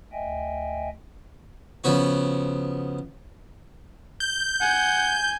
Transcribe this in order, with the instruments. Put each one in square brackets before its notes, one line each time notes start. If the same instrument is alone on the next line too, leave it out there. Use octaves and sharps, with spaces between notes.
[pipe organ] D2 D#5 E5 G5 G#5
[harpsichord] C#3 F3 B3 F#4
[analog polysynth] G6
[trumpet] F#5 [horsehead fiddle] G#5